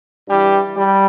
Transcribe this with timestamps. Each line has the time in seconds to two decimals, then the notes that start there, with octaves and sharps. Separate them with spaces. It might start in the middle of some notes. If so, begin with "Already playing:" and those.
0.28 G2 E3 G3
0.76 G3